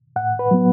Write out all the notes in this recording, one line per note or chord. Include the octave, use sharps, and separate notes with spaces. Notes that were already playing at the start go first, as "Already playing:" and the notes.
A2 F#5
B4
F#3 B3